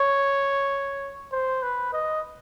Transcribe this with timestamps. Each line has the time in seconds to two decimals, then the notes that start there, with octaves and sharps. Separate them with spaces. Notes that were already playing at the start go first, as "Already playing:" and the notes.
Already playing: C#5
1.32 C5
1.62 B4
1.93 D#5